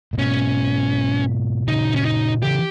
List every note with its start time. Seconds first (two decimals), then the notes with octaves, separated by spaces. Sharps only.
0.13 A#2
0.18 G#2 B2 C#4
1.67 A#2 C#3 D#4
1.96 C#4
2.05 D#4
2.42 C#3 E3 G4